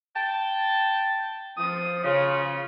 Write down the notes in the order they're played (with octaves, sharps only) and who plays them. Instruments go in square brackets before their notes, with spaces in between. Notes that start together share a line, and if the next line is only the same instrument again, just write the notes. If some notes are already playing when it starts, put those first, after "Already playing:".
[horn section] G5 A5
[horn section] F3 [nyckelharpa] D#6
[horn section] C#3 [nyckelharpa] F4